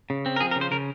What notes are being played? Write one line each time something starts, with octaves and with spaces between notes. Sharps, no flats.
C#3
C4
A#4
F3 G#4
A#4
C#3
C5
C#3 A#4